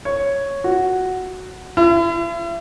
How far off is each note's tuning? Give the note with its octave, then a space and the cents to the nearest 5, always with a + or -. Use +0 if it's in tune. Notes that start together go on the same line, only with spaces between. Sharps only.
C#5 +0
F#4 +0
E4 +40